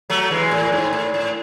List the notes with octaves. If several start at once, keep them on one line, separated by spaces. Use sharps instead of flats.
F#3 A3
E3 G#3
A2
G#2
A2
A2